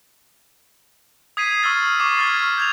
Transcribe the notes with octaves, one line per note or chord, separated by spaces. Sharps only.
D#6 G#6 B6 C7 D#7
C#6 E6 F6 A6
C#6 D6 C7
F6 G#6 A6
C#6
G6 G#6 F7